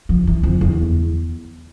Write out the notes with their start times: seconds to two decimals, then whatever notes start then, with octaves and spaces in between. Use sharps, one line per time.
0.09 F3
0.27 E3
0.43 F2
0.61 E2